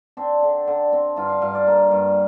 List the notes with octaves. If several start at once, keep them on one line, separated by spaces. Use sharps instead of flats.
C4 D4
D3
D3
C4
G2 F4
F5
G2 F5
D5
A#3
G2